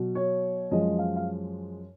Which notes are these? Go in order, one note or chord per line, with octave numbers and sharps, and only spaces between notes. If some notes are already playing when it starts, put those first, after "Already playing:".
Already playing: B2 F#3
C#5
F#2 F3 G#3 D#5
F5
F5